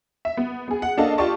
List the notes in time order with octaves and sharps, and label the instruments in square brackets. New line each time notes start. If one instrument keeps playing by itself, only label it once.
[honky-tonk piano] E5
B3
B3 G#4
F#5
A#3 D4 A4 D#5 F5 A5
F4 G4 D5 A5 C#6